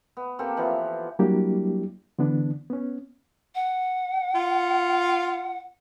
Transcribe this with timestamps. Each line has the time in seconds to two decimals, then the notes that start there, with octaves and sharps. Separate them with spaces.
0.17 B3
0.39 A#3 C4 G4 A4
0.57 E3 F3 B3
1.19 F#3 G3 A#3 D4 E4 G4
2.19 D3 E3 B3 D4
2.70 B3 C#4
3.55 F#5
4.35 F4